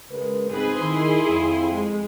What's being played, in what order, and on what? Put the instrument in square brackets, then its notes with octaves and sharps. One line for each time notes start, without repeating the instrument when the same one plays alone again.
[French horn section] C#3 A#4 B4 [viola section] G#3
[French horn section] G#2 [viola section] C4 B4 [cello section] G#4
[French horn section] D#3 [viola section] E4 C6
[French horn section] F2
[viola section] G#3